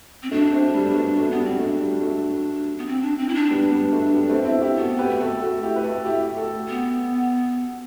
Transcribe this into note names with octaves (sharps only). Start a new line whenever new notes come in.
C4
F#3 A3 D4
A3 C4
G3
B3
F#3 A3
F#3 A3
B3
G3
C4
F#3 A3 D4
G3
F#3 A3
B3
C4
D4
C4
E4
D4
G3 B3
G3 B3
F#3 A3
G3 B3
A3 C4
C4 E4
E4 G4
B3 F#4 A4
G4 B4
A3
F#4 A4
F#4 A4
E4 G4
B4
F#4 A4
E4 G4
F#4 A4
B3